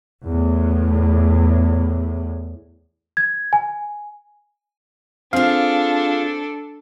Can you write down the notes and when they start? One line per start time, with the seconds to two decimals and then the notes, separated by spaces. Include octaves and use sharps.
0.24 E2 A2
3.17 G#6
3.53 G#5
5.33 C4 D4 F4 G#4 A4 F5